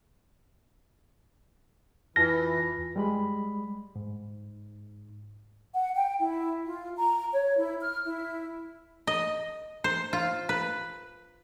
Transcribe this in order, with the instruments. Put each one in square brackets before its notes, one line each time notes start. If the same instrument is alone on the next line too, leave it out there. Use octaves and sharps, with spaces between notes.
[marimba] F2 F4 [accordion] E3 [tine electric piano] A#6
[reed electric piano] G3 G#3 B5
G#2
[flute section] F#5
G5
E4
F4
A#5
C#5
E4
F6
E4
[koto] D#5
C5
F4
B4